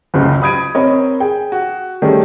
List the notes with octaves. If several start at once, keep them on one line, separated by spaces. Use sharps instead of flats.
F#1 C#2 F#2
B5 D#6 G#6 D7 D#7
C4 A#4 C#5 D#5 B5
G#4 G5
F#4
D#3 G3 A3 C#4 D#4 G#4